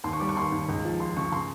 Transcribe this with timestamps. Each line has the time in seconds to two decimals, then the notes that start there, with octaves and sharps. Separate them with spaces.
0.04 D#2 C6
0.13 C#6
0.20 G3 D6
0.29 C#6
0.36 D#2 C6
0.52 D#2
0.69 C#2
0.85 F3
1.00 F3 C6
1.17 C#3 C#6
1.32 C#3 C6